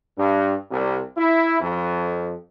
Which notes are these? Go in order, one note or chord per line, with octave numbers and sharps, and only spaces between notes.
G2
C2
E4
F2